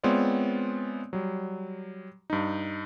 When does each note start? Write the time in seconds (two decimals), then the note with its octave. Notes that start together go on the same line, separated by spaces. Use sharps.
0.03 G#3 B3 C4 F4 C#5 D5
1.13 F#3 G3
2.30 G2 D#4